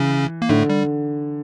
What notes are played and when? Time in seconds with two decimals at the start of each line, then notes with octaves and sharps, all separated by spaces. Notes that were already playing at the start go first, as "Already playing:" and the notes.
Already playing: C#3 E3 C#4
0.42 A#3
0.49 A2 D3 A3
0.69 G3